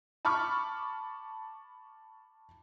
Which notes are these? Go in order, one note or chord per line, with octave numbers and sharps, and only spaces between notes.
A5 B5 C#6 D6 F6